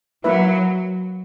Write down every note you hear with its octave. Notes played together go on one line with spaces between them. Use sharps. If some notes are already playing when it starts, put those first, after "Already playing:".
F#3 A#3 E4 B4 E5